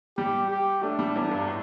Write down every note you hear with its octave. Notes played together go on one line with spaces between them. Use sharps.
G3 G4
G4
A3 D4
G3
E2
G2
A2